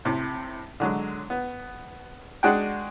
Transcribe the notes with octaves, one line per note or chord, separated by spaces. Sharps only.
A2 C3
D3 F#3 G#3
B3
G#3 D4 F#4 G#4 F#5 G5